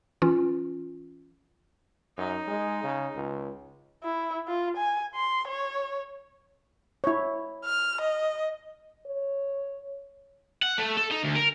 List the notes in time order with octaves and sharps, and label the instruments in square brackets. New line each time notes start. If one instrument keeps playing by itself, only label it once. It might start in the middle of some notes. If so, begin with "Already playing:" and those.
[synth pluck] E3 C#4 F4
[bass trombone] F#2 [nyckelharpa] D#4
[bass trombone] G#3
C#3
C#2
[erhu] E4
F4
G#5
C6
C#5
[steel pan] E4 C#5
[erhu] F6
D#5
[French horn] C#5
[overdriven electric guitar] F#5
A3
A4
D#4
D2
A#4